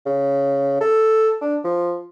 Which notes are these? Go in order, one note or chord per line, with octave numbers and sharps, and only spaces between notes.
C#3
A4
D4
F3